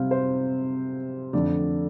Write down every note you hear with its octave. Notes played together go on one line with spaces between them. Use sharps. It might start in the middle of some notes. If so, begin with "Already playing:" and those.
Already playing: C3 G3 C4 F5
C5
F2 D3 A3 D4 D5